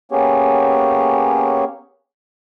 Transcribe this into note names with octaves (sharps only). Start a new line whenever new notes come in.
A#3 B3 C#4 G4 G#4 C#5